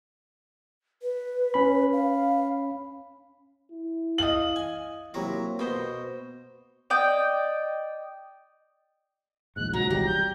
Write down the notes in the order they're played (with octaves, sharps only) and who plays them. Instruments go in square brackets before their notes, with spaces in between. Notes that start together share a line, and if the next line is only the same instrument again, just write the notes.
[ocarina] B4
[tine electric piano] C#4 B5
[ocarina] F5
[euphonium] E4
[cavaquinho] D#5 F5 [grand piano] F#7
[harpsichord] G#5
[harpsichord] C3 F#3 E4 [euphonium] A#3 [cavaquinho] A#5
[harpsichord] B2 [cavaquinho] C5 D#5 B5
[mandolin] D5 D#5 G5
[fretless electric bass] D#1 A#1 G#2 [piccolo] F#6
[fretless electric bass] G#2 C#3 [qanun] F#3 [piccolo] A#5
[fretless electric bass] C2 E3 G#3 [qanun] G4 [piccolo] A#6
[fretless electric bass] G3 [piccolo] G6